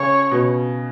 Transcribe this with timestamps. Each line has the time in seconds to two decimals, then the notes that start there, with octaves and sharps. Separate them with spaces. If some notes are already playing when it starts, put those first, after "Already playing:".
Already playing: C#3 C#5
0.31 B2